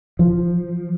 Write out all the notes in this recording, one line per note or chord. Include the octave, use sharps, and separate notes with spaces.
F3